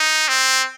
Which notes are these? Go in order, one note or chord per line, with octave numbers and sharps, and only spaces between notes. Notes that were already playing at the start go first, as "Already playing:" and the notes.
Already playing: D#4
C4